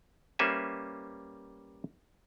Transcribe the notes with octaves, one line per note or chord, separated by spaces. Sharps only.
G3 A#3 C#4 B4 C5 E5